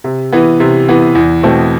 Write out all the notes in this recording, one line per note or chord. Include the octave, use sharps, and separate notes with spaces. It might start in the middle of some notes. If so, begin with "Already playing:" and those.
C3
E3 B3
C3
E3 B3
E2
B2 A3 C4